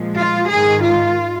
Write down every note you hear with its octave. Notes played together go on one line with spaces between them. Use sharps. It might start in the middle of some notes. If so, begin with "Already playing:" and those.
Already playing: A#2 F3 G#3
F4
G#2 D#3 G#3 G#4
F4